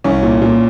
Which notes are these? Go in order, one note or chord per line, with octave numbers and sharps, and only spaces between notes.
C2 C#4
A#2
A#2